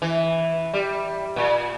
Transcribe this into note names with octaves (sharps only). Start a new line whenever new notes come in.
E3
G3
A#2